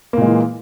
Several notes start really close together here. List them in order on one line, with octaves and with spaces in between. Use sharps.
A#3 A#2 G#3 E3